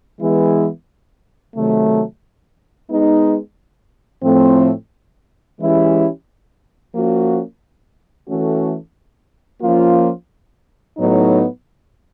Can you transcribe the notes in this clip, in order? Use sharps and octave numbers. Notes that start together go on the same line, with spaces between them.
E3 G#3 B3 E4 G#4
C3 D#3 F#3 A3
G#3 B3 D#4
A2 F3 A3 C4
E3 G#3 C#4 E4 G4
F3 A#3 C#4 F#4
E3 A3 C#4 F#4 A4
F3 A#3 C#4 F4
A2 F#3 B3 D#4